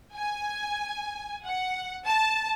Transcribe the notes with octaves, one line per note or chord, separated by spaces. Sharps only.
G#5
F#5
A5